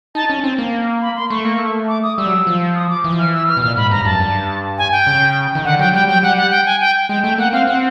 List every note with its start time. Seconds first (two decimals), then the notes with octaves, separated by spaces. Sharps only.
0.15 D#4 A5
0.30 C#4
0.44 C4
0.58 A#3
1.02 B5
1.16 C6
1.30 A3 C#6
1.45 A#3
1.59 A3
1.88 D6
2.03 D#6
2.17 G3 E6
2.27 F#3
2.47 F3
2.75 D#6
2.89 D6
3.04 E3
3.12 F3
3.19 E3 F6
3.33 E6
3.48 F6
3.57 B2
3.62 A#2 F6
3.77 G#2 B5
3.91 G2 A#5
4.05 F#2 A5
4.20 G2
4.78 G#5
4.92 G5
5.07 C#3
5.55 D#3
5.65 D3 F#5
5.79 F#3 G5
5.93 G3 G5
6.08 F#3 G5
6.23 G3 F#5
6.37 F#5
6.51 G5
6.66 G#5
6.81 G5
7.09 G#3 G5
7.24 A3 G5
7.38 A#3 F#5
7.53 C4 F5
7.67 C4 F#5